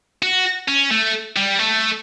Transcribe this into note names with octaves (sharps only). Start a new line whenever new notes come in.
F#4
C#4
A3
G3
A3